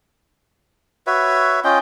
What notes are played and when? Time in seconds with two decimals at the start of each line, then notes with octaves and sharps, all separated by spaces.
1.07 F#4 B4 C#5 E5
1.64 C#4 F4 D#5 G5